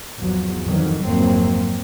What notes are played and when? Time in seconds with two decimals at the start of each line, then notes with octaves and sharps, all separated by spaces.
0.19 G#1 E2 F3 F#3
0.66 F2 A2 D#3 E3 F#3
1.04 G#1 F2 F#3 A#3 C4